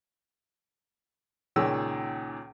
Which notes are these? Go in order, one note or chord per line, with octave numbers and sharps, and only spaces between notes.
C#2 A#2 D#3 C#4 G#4 E6